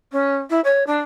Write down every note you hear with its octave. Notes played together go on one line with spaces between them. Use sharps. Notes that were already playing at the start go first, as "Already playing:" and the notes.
C#4
E4
C#5
D4